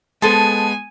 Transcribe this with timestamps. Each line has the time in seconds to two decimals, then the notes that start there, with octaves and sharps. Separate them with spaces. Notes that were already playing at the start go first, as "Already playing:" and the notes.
0.22 G#3 B3 A4 C5 G#5 A5